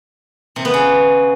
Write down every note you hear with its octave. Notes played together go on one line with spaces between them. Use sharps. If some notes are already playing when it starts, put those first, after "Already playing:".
C3
B3
C#3